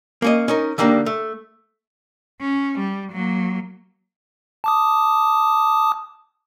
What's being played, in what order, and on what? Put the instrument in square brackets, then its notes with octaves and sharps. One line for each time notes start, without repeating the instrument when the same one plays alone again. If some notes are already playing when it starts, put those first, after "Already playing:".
[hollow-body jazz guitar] A#3 C#4 D#5
C#4 D#4 A#4
D3 D#3 G3 A#3 D4
A3
[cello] C#4
G3
F#3 A#3
[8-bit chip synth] A5 D6 D#6